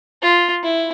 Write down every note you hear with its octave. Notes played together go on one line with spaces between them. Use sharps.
F4
E4